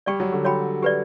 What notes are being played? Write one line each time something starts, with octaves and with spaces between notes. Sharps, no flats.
G3 G4 D5 G5 C#6
F#3
D3
F#4 C#5 G5 B5
G4 B4 D5